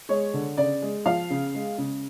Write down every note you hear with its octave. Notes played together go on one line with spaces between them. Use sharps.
G#3 C#5
D3
C#3 D5
G#3
F3 F5
C#3
G#3
C#3